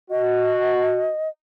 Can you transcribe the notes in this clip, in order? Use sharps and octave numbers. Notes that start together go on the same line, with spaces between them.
F#4 D#5